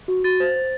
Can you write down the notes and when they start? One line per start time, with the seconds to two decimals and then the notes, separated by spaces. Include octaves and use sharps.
0.08 F#4
0.24 F#4 A6
0.40 C5
0.56 C5